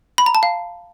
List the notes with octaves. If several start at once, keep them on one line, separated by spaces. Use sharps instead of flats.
B5
A#5
A5
F5